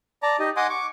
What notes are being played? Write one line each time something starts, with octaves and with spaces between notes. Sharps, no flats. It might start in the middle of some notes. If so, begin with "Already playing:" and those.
D5 A5 A#5
D#4 G4 D#5
D#5 F#5 G#5 C6 D6 D#6
C#6 D6